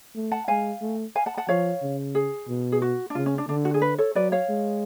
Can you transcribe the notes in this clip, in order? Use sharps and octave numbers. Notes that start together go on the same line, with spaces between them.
A3
F#5 A5
G#3 F5 G#5
A3
F5 G#5
F#5 A5
F#5 A5
F3 C#5 F5
C#3
G#4
B2
G#4
F#4
D4
C#3 F4
C#4
D4
D3 D4
F#4
G#4
B4
A4 C#5
F#3 B4 D5
C#5 F5
G#3